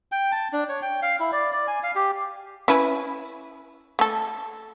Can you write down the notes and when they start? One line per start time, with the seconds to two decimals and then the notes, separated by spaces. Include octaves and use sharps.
0.12 G5
0.32 A5
0.53 D4
0.69 C#5
0.82 G5
1.02 F5
1.20 E4
1.32 D5
1.53 D5
1.68 G#5
1.83 F5
1.96 G4
2.68 C#4 E4 B4
3.99 A3 A4